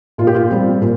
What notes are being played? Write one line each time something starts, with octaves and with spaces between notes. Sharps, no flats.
A#2 F4
G4
F4
G3 C4
A#2